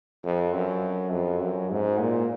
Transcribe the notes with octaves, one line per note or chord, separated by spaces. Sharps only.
F2
F#2
F2
F#2
G#2
A#2